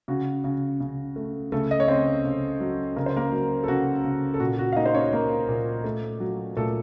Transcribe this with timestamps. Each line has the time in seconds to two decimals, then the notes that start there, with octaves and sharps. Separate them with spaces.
0.08 C#3 F#4
0.44 C#3
0.80 C#3
1.16 A3
1.52 C#3 A3 A4
1.71 D#5
1.80 C#5
1.88 C#3 C4 C5
2.25 C#3
2.60 F#3
2.96 C#3 A#4
3.06 C5
3.17 A#3 A#4
3.32 F#3
3.64 A4
3.68 C#3 F#4
4.04 C#3
4.34 A4
4.40 A#2 F#4
4.58 F#4
4.72 F5
4.76 A#3 D#4 D#5
4.86 C5
4.94 C#4 C#5
5.13 A#3 A#4
5.49 A#2
5.84 A3
6.20 F#3
6.57 A#2 A3 A4